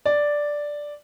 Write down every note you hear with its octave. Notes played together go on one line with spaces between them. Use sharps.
D5